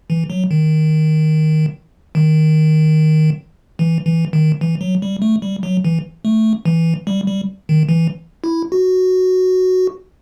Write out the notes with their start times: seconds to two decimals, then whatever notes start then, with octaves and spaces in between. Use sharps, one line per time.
0.10 E3
0.30 F#3
0.51 D#3
2.15 D#3
3.79 E3
4.06 E3
4.33 D#3
4.61 E3
4.81 F#3
5.02 G3
5.22 A3
5.42 G3
5.63 F#3
5.84 E3
6.25 A3
6.65 E3
7.07 G3
7.27 G3
7.69 D#3
7.89 E3
8.44 E4
8.72 F#4